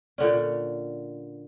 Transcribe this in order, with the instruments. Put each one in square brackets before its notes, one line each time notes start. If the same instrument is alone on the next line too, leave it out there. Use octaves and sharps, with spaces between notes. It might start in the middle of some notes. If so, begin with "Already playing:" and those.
[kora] A#2 D3 C#4 [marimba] D5